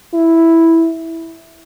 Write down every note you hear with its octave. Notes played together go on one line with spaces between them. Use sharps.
E4